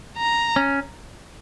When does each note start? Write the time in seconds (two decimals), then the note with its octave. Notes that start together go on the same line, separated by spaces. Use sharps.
0.18 A#5
0.56 C#4